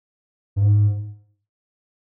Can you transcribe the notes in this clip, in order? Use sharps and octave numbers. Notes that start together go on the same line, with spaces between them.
G2
G#2